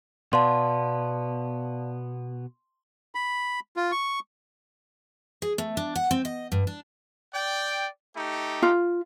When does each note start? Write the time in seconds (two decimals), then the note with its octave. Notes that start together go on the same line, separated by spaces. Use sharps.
0.33 B2 B3 D5 F5 A5 C6
3.15 B5
3.77 F4
3.92 C#6
5.42 G#4
5.58 A3
5.77 D4
5.96 F#5
6.11 C4
6.25 D#5
6.52 G2
6.67 D4
7.35 D5 G5
8.16 A3 D#4 G4
8.62 F4